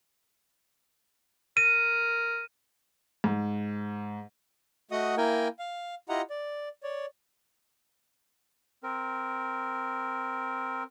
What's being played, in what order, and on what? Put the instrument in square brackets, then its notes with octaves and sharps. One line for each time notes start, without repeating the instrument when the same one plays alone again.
[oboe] A#4 [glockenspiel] D#7
[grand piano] G#2
[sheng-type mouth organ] A3 F#4 D#5 F#5 D#6
A#3 E4 A#4 G5 G#5
F5
E4 F4 G4 D#5 F#5 A#5
D5
C#5 D5
[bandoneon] C4 A#4